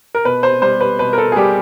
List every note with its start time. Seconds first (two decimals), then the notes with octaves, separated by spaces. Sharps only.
0.15 A#4
0.25 B2 B4
0.43 C5
0.62 G3 C5
0.81 B4
0.99 B2 B4
1.13 A#4
1.18 A4
1.32 G#4
1.36 G3 G4